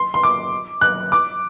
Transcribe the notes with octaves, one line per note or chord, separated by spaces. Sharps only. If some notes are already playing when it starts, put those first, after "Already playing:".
Already playing: C6
C6
D6
F#6
D6